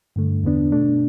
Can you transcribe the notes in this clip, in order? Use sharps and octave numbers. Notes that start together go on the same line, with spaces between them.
G2 D3 A3
E2 D3 B3 D4
B2 A3 D4